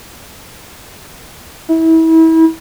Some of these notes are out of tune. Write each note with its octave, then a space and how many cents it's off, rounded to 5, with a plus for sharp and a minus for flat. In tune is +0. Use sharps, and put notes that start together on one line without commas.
E4 -30